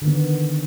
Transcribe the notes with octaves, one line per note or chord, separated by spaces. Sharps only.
D3 D#3 B3